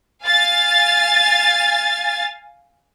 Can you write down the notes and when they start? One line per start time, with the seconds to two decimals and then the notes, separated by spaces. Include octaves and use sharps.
0.23 F5 G#5 A6